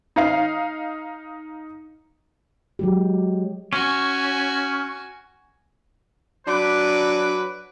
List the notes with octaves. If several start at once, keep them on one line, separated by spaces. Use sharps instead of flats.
D#4 F5
F#3 G#3 G4
C#4 F#4 G#5
F#3 D4 B4 D6